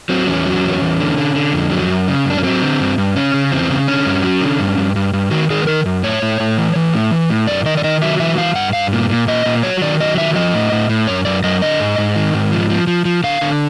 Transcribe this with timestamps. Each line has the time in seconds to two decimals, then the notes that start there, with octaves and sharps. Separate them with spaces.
0.09 F#3 C4
0.27 E2 C#4
0.46 F#3
0.64 E2
0.82 E2
1.00 D3
1.18 D3
1.35 D3
1.53 F2
1.71 F#3
1.90 F#2
2.08 C#3
2.25 F#2 D4
2.37 C#4
2.43 F#3 C4
2.62 D3
2.80 G2
2.98 G2
3.15 C#3 C#4
3.34 C#3
3.51 E2 C4
3.70 C#3
3.88 D3 C#4
4.06 G2
4.24 F#3
4.41 D3
4.59 G2
4.78 G2
4.96 G2
5.13 G2
5.31 D#3 F#4
5.50 D#3 G#4
5.62 B4
5.67 D#3 A#4
5.86 F#2
6.03 A2 C#5
6.22 A2
6.40 A2
6.58 E3
6.76 E3
6.94 A2
7.11 E3
7.30 A2
7.47 F#2 D5
7.65 D#3 D#5
7.77 D5
7.84 D#3 D#5
8.02 F#3 E5
8.20 E3 E5
8.38 E3 F5
8.55 G2 F#5
8.73 G2 F5
8.92 A#2
9.09 A#2
9.28 A#2 D#5
9.46 A#2
9.63 F#3 C#5
9.82 D#3 D5
10.00 F#3 D#5
10.17 D#3 E5
10.36 F3 D#5
10.54 A2
10.72 A2
10.89 A2
11.07 F#2 C#5
11.25 F#2 D5
11.44 F#2 D#5
11.62 D3 D#5
11.80 G#2
11.98 G#2
12.16 D#3
12.34 G#2
12.52 F3
12.70 F3
12.87 F3
13.05 F3
13.24 D3 F5
13.41 D3